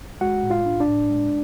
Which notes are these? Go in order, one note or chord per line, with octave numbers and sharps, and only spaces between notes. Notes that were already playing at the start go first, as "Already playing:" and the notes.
G#3 F#4 F#5
A2
F4 F5
D4
D4 D5
A2
G#3